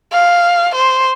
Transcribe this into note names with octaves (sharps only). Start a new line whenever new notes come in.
F5
C5